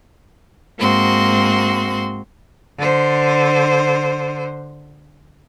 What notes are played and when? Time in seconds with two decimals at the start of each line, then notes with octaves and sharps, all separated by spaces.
0.78 G#2 A#3 C4 F#4 C6
2.78 D3 C5